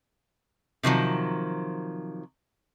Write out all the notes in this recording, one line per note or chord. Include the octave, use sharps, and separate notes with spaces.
C3 D#3 F3 F#3